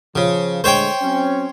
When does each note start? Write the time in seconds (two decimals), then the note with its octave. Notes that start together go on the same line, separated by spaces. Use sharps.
0.16 C#3 F3
0.64 D3 G#3 A3 C5 C#5 G5
1.01 F#3 C4 C#4